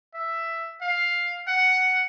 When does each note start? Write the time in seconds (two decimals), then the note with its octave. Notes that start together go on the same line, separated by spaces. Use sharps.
0.15 E5
0.81 F5
1.48 F#5